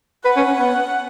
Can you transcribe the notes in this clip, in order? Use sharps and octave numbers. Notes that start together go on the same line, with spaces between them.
B4 F#5
C#4
C#4
B3